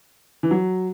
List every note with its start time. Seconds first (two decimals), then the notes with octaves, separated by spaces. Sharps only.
0.43 E3
0.51 F#3